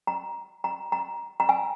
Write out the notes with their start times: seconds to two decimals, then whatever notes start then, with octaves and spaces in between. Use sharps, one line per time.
0.07 A#5
0.64 A#5
0.92 A#5
1.40 A#5
1.49 G#5